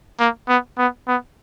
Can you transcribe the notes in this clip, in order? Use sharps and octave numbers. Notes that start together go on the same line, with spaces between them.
A#3
B3
B3
B3